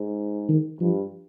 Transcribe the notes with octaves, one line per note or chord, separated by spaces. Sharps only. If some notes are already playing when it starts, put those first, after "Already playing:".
Already playing: G#2
D#3
G2 F3